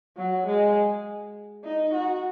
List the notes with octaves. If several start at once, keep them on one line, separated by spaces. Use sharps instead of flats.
F#3
G#3
D#4
F#4